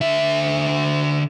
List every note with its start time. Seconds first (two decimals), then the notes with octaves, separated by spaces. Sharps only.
0.01 D3 E5